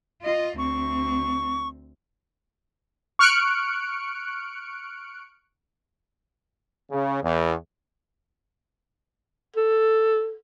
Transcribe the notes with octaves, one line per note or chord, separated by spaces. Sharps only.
F4 D#5
D2 C4 C#6
C#6 F6 F#6 C#7 D7
C#3
E2
A4